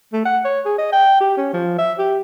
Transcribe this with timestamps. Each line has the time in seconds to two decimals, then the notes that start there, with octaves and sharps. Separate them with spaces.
0.13 A3
0.25 F#5
0.45 C#5
0.66 G#4
0.79 D#5
0.93 G5
1.21 G4
1.37 C#4
1.53 F3
1.78 E5
1.99 G4